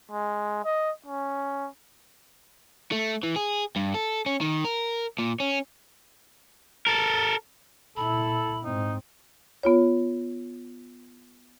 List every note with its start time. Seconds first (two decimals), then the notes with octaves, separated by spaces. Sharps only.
0.12 G#3
0.65 D#5
1.06 C#4
2.92 A3
3.23 E3
3.36 G#4
3.76 G2
3.94 A4
4.26 C#4
4.41 D#3
4.65 A#4
5.19 A#2
5.40 C#4
6.87 A4 A#4
7.97 A#2 E4 A4 B5
8.64 G#2 C4 D#4
9.63 B3 F4 C#5